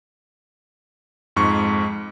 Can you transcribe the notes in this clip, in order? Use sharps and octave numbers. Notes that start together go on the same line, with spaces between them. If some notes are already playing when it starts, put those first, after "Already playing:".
F2 G#2 C#6